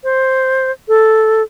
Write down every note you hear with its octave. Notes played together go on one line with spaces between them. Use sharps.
C5
A4